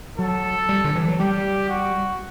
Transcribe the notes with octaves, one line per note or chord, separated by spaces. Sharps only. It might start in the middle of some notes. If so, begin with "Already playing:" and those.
F#3 A4
G3
D3
E3
F#3
G3 G4
F#4